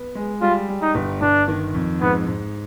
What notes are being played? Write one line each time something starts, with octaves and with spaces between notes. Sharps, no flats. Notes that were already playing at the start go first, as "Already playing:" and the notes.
Already playing: B3
G#3
G3 F4
G3
D#4
G1
G1 D4
D#3
F2
G#2 B3
G#2